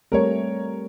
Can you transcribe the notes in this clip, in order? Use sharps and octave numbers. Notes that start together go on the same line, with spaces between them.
G3 A3 C4 A#4 C#5